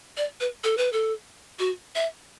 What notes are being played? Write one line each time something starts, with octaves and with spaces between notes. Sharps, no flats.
D5
B4
A4
B4
A4
F#4
E5